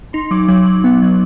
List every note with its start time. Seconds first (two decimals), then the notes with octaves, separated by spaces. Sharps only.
0.13 D#4 C6
0.31 F#3 D6
0.48 F#3 D6
0.66 F#3
0.84 B3
1.02 F#3